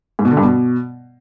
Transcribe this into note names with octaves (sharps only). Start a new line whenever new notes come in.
G#2
B2
D3
G2
B2